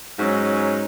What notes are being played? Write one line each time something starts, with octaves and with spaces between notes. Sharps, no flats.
G#2 F#3 C#4